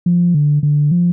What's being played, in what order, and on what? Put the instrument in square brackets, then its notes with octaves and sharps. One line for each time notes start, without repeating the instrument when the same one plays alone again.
[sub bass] F3
D3
D3
F3